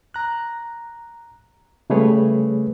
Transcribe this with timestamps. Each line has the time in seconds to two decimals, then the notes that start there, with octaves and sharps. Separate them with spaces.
0.14 A#5 F#6
1.90 C#3 G3 A3 G#4 B4 C#5